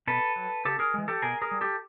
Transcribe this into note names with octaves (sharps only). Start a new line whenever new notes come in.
B2 A4 B4
F#3
C#3 G4 A4
G#4 A#4
E3 G#3
G4 A4
B2 G#4 A#4
G#4 A#4
G3
G4 A4